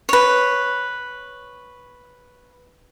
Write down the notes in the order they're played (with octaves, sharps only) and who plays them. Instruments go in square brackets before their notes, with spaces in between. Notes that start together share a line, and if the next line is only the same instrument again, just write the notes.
[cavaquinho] B4 C#5